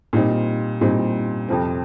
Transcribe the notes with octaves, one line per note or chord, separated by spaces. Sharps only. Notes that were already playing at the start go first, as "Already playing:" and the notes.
A#2 G3 C4 D#4
A#2 G3 C4 D#4
F2 C3 F3 C4